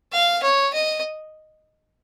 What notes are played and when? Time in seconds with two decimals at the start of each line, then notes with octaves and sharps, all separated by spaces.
0.13 F5
0.43 C#5
0.73 D#5